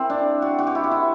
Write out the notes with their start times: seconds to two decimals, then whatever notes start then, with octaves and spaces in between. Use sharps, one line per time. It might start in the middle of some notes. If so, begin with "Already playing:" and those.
Already playing: C4 E4
0.10 D4
0.42 F#4
0.59 F#4
0.67 G4
0.75 E4
0.84 F#4
0.91 E4